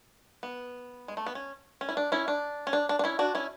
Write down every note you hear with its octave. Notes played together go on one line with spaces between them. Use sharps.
B3
G#3
A3
B3
C#4
C#4
E4
D4
C#4 E4
D4
C#4
D4
D4
D4
C#4 E4
D4 F#4
C#4 E4